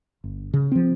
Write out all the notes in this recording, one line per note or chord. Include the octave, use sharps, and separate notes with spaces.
G1
C#3
F3 C4